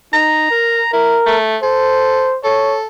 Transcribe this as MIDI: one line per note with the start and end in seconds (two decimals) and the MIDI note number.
0.13 0.49 63
0.13 0.90 82
0.51 0.82 70
0.93 1.19 64
0.93 1.38 70
1.26 1.57 57
1.63 2.31 69
1.63 2.38 72
2.44 2.87 69
2.44 2.78 73